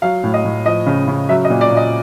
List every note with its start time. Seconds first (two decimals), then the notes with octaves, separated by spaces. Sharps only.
0.02 F#3 F5
0.24 A2
0.34 D#5
0.45 A2
0.66 F3 D#5
0.86 C#3
1.08 C#3
1.29 F#3 E5
1.44 D#5
1.50 A#2
1.61 D5
1.71 A#2
1.77 D#5